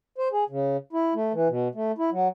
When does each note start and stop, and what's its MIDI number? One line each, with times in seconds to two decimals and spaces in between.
0.18 0.28 72
0.32 0.44 68
0.50 0.77 49
0.93 1.14 64
1.15 1.33 57
1.33 1.48 52
1.49 1.68 47
1.75 1.92 57
1.98 2.10 64
2.12 2.28 54